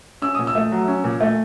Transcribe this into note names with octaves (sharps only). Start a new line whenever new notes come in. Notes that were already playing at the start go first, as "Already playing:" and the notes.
C#4 E6
A#2 D#6
E6
A3
F#3
C#4
A#2
A3